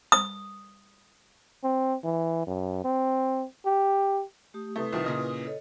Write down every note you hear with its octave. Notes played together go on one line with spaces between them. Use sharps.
D#6
C4
E3
F#2
C4
G4
A3 G4 D#6
C3 A3 E4 B4 D#6
C2 D#3 F3
A#2 C#3 D#4
A4 C#5 D#5